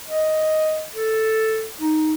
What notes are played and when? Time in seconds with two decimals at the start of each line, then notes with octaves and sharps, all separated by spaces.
0.08 D#5
0.94 A4
1.79 D#4